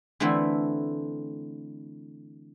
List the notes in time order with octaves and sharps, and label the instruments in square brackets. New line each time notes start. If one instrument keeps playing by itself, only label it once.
[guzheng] D3 E3 A3 C4 E4